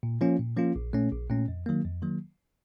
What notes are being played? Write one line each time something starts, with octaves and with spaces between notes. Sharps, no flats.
A#2
F3 A#3 C#4 F4
A#2
F3 A#3 C#4 F4
A#1
A#2 A3 C#4
A#1
A#2 A3 C#4
F2
D#3 F#3 A#3
F2
D#3 F#3 A#3